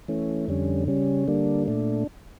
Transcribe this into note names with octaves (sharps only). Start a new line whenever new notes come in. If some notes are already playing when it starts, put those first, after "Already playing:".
E3 A3 C#4
F2 D3 G3 C#4
C#3 G3 C#4
D3 G3 A#3 D4
A#2 A3 D4